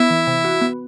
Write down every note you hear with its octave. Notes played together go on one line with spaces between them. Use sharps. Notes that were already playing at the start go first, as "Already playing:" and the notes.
Already playing: B3 E4 E5
E3
C3
F#4
B3